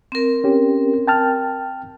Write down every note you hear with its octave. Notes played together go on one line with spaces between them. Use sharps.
C4 A#4
C#4 G4
G5 A5 F6